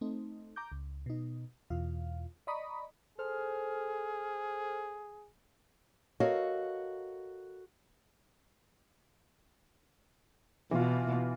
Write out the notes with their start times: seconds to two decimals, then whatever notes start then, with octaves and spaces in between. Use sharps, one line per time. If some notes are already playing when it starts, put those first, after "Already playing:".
0.01 A3 C4 D#4
0.56 A#5 D6 G6
0.72 C#2
1.06 B2 D#4
1.70 E2 B2 F4 F5
2.47 D5 D#5 A#5 B5 C#6 D#6
3.18 G#4 A4 C5 F6
6.20 F#4 A4 A#4 C#5 D#5 F5
10.71 B2 E3 F4